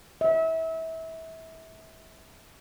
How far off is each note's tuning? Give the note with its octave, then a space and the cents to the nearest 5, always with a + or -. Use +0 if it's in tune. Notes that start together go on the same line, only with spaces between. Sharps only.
E5 -30